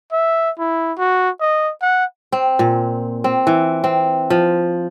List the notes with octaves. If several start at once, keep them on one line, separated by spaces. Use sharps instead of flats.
E5
E4
F#4
D#5
F#5
C4
A#2
C4
E3
C4
F3